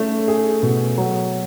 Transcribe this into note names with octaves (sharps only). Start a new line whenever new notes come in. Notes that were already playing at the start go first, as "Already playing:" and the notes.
Already playing: A3 C#4
G#4
B2
F#3